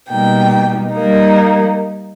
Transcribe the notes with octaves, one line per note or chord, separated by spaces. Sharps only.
B2 G3 A#3 D#4 G5
G3 A#3 D#4